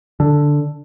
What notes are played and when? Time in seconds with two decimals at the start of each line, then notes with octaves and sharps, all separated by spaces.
0.20 D3